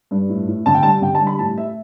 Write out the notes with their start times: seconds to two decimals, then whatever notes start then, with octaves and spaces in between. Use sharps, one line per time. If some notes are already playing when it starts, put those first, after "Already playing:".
0.11 G2
0.29 A2
0.48 A2
0.66 D3 A5
0.75 G5
0.83 G3 A5
1.02 D3 G5
1.15 A5
1.20 G3
1.27 B5
1.39 A2 A5
1.57 A3 E5